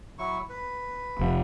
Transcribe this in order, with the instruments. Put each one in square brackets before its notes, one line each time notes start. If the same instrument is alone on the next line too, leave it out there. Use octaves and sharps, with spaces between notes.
[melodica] F#3 E4 C#6
B4
[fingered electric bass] F1